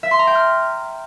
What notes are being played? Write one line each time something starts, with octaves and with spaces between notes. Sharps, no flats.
E5
C6
A#5
G5
F6